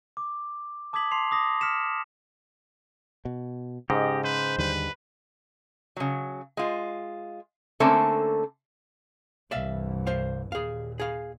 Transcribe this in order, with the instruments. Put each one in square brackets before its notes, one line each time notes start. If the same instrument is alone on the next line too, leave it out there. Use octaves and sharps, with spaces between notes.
[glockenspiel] D6
A5 D6 D#6 G#6 B6 F#7
A5 C6 D6 C7 F7
D6 D#6 A#6
F6 B6 C#7 E7
[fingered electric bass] B2
[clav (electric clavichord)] G#2 [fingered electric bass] C#3 [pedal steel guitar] G4 D#5
[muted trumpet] B4 [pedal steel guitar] C5
[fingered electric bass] D#2 D3 G3 [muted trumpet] B4
[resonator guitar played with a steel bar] C#3 F#3
G#3 F4
D3 A3 A#3 C4 C#4 A4
[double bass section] C2 G2 E3 [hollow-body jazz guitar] D5 E5 F5
[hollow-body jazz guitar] C5 F5
[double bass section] D#2 A#2 [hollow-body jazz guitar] G#4 F5
[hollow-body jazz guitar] G#4 F5